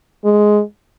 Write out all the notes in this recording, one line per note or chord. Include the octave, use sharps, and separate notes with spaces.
G#3